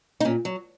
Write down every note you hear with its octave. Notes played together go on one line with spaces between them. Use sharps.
D#4
A#2 C#4
F#3